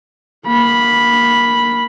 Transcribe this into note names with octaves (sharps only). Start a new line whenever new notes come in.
A#3 B5